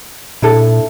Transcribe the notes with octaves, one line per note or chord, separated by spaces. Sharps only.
A#2 D4 E4 A4